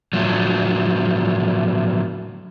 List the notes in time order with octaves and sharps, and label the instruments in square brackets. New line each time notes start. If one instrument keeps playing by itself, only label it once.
[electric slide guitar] A2 F3 F#3